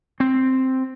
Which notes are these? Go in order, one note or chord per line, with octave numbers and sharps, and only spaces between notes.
C4